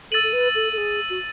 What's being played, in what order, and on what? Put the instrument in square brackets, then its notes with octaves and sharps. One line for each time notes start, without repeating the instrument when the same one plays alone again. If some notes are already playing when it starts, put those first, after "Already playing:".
[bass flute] A4 [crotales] E6 A6 D#7 F#7
[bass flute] A4
B4
A4
A4
G#4
F#4